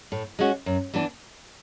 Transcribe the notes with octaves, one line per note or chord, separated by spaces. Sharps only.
A2
G#3 C#4 F#4
F#2
E3 B3 D4